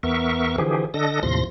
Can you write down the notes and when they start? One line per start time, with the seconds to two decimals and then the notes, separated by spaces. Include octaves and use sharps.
0.03 E2 B3 A#4 E5 C#6
0.58 D3 E3 F3 G4 G#4
0.94 D3 D4 A4 D#5 A#6
1.23 D#2 A2 C3 F3 C6 A#6